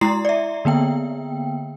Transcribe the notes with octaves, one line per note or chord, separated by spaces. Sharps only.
G#3 E4 A#5 C6 C7
D5 E5
D3 A#3 B3 G5